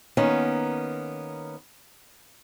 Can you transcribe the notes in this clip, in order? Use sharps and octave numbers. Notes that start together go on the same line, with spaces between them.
D#3 A#3 B3 C#4